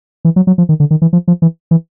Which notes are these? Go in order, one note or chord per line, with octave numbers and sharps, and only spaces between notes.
E3
F#3
F#3
F3
D#3
D3
D#3
E3
F3
F3
E3
E3